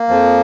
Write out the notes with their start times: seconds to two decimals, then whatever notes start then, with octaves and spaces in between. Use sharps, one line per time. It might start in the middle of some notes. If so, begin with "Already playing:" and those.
Already playing: A#3
0.08 F2 F3